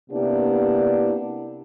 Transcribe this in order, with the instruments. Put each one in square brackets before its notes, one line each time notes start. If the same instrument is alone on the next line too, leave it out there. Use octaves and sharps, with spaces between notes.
[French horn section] C3 A#3 B3 D4 E4 G4